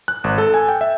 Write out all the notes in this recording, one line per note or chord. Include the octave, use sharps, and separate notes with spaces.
F#6
G#1
A4
G#5
G5
E5